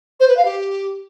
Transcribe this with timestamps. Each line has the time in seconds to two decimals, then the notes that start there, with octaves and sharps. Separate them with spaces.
0.20 C5
0.28 B4
0.37 F5
0.45 G4